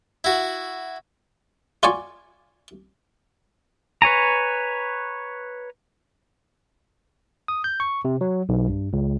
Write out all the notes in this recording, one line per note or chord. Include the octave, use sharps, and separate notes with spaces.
E4 F#4
F4 F#4 D5 G#5 C#6
B4 C#5 G#5 A#5
D#6
G6
C#6
C3
F#3
B1
G2
C#2